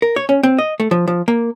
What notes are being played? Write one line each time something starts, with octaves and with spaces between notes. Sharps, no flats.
A#4
C#5
C#4
C4
D#5
A3
F3
F3
A#3